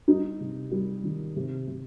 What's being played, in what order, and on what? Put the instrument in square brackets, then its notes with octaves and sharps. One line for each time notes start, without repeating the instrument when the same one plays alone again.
[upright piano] G3 D#4
C3
G3
D#3
C3
C3